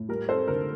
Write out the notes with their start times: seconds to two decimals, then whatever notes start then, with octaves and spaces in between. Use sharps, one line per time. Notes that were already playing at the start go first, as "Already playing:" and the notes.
Already playing: A2
0.09 G3 A#4
0.28 C4 A4 C5
0.48 D3 A#4